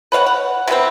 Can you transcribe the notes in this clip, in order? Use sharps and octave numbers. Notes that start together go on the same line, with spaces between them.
B4 C#5 F5 F#5
F#5
C3 F#3 B3 C4